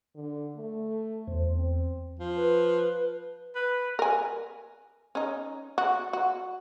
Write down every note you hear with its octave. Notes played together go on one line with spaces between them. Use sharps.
D3
A3
E2 C5
C4
F3
B4
B4
A#4 G#5
C#4 D#4
F#4
F#4